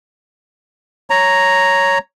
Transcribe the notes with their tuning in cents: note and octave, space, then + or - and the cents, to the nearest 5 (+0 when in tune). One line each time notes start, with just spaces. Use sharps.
C#5 +0 A#5 +0